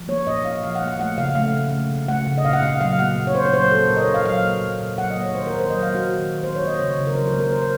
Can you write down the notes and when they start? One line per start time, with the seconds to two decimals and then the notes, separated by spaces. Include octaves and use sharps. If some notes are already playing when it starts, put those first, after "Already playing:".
Already playing: F3
0.08 A#3 C#5
0.27 A#2 D#5
0.45 A#2 F5
0.63 F3 F5
0.75 F#5
0.81 A#3
0.87 F#5
0.99 A3 F#5
1.18 C#3 F5
1.35 A3 F5
1.54 C#3
1.72 A3
1.90 C#3
2.08 A3 F#5
2.26 C#3
2.38 D#5
2.45 A#2 F5
2.53 F#5
2.62 A#2 F5
2.81 F#3 F5
2.98 A#3 F#5
3.17 A#2
3.27 C#5
3.35 A#2 C5
3.45 C#5
3.53 F#3 C5
3.71 A#3 A4
3.89 A#2 A#4
3.96 D#5
4.01 C#5
4.07 A#2
4.14 F5
4.26 F#3 F5
4.45 A#3
4.62 A#2
4.80 A#2
4.98 F#3 F#5
5.10 D#5
5.17 A#3
5.23 C#5
5.35 D#3 C5
5.47 A#4
5.53 D#3
5.59 C5
5.70 F#3 D#5
5.83 F5
5.89 A#3
5.95 F#4
6.07 D#3
6.25 D#3
6.43 F#3 C5
6.56 C#5
6.61 A#3
6.67 D#5
6.79 C#3 C#5
6.98 C#3
7.07 A#4
7.15 F#3 C5
7.28 A#4
7.34 A#3
7.40 A#4
7.52 C#3 C5